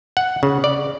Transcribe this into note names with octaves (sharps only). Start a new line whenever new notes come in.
F#5
C#3
D5